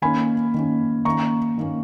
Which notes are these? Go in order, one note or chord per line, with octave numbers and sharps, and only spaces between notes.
D#3 A#3 C#4 G#5 B5
D#3 A#3 C#4
D#3 A#3 C#4 A#5 C#6
D#3 A#3 C#4